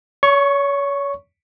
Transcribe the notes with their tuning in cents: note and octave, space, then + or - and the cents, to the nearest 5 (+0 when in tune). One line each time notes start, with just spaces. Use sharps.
C#5 +30 C#6 -5